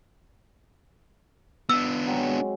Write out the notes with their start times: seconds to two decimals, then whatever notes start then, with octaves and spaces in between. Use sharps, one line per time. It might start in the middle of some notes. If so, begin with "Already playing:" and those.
1.69 B3 D4 E6
2.07 F#3 G#3 C4